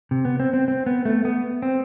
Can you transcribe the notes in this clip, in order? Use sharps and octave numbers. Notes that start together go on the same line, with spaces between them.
C3
B3
C4
C4
C4
B3
A3
B3
C4